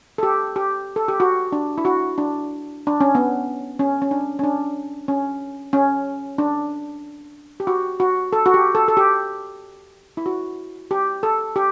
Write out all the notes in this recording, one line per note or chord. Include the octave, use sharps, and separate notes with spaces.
A4
G4
G4
A4
G4
F#4
D4
E4
F#4
D4
D4
C#4
B3
C#4
C#4
D4
C#4
D4
C#4
C#4
D4
G4
F#4
F#4
A4
F#4
G4
A4
A4
G4
E4
F#4
G4
A4
G4